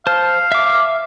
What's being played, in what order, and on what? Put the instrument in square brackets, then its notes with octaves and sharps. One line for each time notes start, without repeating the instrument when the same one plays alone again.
[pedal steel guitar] C5 A5 [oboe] F5
[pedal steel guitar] E5 D6